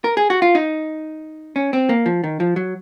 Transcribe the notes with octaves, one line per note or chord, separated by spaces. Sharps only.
A#4
G#4
F#4
F4
D#4
C#4
C4
A#3
F3
D#3
F3
F#3